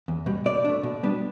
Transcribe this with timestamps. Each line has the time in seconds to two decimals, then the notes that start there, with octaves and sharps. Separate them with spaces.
0.08 E2
0.26 B2 G3
0.46 B2 D5
0.65 A3 D4
0.83 B2
1.03 G3 B3 D4